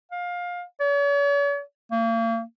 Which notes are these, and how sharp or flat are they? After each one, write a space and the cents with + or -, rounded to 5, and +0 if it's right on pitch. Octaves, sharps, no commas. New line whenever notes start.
F5 +20
C#5 +45
A#3 -35